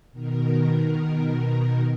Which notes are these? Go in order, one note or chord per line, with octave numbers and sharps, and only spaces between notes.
B2 D#3 A#4